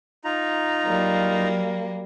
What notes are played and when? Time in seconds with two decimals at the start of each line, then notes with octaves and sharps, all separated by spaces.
0.24 D#4 F4 A#5
0.86 F#3 G3 A#3